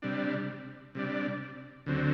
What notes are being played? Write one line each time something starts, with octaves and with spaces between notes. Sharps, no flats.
C3 G3 D4
C3 G3 D4
D2 D3 F#3 C4